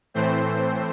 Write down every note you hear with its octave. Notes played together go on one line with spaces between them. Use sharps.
A2 E3 A3 C4 C5